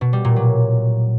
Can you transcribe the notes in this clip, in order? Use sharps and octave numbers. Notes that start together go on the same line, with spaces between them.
B2
G3
A#2
F#3